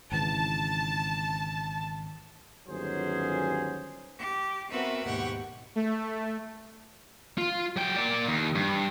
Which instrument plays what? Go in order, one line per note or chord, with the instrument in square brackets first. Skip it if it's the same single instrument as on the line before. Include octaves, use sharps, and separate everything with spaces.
[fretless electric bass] G#1 C#3 E3 [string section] A5
[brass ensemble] G1 D#2 F#3 C#4 G#4 C5
[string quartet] G4
B3 C4 F#4 A#4 B4 E5
D#2 G#2 B2 G4 F#5 C#6
[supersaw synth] A3
[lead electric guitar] F4
F#3 G5
A#3 D5
D#2
G2